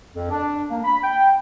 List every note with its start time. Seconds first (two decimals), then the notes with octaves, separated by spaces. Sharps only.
0.15 F2
0.31 D4
0.70 A#3
0.84 B5
1.04 G5